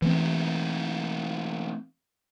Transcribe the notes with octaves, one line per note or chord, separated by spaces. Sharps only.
E3 A3 C4